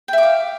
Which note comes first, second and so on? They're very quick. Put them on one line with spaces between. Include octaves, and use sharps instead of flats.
G5 E5 D6 F5